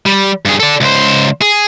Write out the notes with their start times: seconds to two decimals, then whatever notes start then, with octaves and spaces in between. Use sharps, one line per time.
0.06 G3
0.45 G2 G#4
0.60 A4 D5
0.81 C#2 C5
1.41 G#4